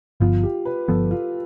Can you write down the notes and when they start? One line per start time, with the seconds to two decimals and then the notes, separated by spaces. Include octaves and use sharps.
0.20 G1 G2 F3 B3 F4
0.43 G4
0.65 B4
0.88 G1 G2 F3 B3 A4
1.11 F4